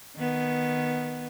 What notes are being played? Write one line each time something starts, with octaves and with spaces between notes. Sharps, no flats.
D#3 B3